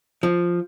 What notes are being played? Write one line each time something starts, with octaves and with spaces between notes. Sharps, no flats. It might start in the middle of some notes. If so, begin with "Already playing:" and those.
F3